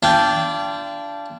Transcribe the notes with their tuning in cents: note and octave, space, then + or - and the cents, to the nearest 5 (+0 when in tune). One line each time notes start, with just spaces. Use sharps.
D4 -15 F4 -35 G5 +0